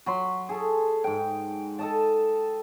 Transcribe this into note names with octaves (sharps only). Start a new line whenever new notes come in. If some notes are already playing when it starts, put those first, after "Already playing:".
F#3 B5 C6
G#4 A4
G#2 G5
A4 D#5 A5